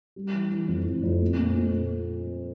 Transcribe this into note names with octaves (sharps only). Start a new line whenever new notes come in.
G3
E3
E3
F2
F2
F2
A#2
A#2
A#2